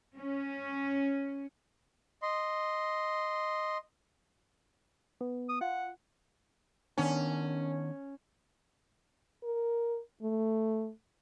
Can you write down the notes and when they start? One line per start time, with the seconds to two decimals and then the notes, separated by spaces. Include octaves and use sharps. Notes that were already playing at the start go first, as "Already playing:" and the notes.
0.16 C#4
2.22 D#5 C6
5.21 B3
5.49 D#6
5.61 F4 F#5
6.98 D#3 B3 C#4 D4
9.43 A#4
10.22 A3